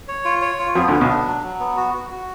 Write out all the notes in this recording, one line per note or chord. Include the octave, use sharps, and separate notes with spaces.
C#5
F4
C#5
F4
F2 F3 B3
D2 D3
B3
B1 B2
D4
F#3
F#3
B3
F#4
F#4
F#4